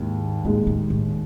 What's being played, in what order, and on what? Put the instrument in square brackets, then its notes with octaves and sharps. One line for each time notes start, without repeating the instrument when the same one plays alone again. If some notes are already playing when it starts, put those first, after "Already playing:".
Already playing: [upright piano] D#2 D#3 G#3 [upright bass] G#2
[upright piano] D#2 D#3 G#3 [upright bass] A2
[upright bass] A2
A2